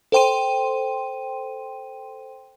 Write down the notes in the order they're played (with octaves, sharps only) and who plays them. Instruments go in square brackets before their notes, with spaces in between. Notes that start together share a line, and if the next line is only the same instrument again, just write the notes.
[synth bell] A4 C5 G5 C6 D#7